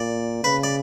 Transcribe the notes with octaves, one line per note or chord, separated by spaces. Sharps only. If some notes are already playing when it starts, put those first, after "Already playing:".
Already playing: A#2 D5
C#3 B4
D5